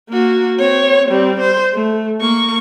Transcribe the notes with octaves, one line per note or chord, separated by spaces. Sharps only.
A#3 F#4
C4 C#5
G3 C4
C5
A3
A#3 C#6